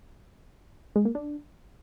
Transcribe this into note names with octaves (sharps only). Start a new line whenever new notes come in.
G#3
A#3
D4